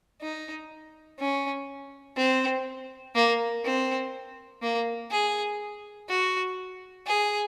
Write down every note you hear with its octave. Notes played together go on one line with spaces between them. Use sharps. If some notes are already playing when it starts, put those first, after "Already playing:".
D#4
C#4
C4
A#3
C4
A#3
G#4
F#4
G#4